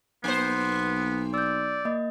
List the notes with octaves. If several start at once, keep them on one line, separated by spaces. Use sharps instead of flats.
B1 A#3 B3 C5
D5 E6 G6
A#3 D#5